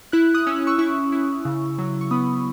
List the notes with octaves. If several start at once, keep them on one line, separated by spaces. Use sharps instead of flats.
E4 F#6
D#6 F#6
C#4 E6
F#6
C#6 E6
E4 C#6 E6
E4
C#3
F#3
C#6
B3 B5 D#6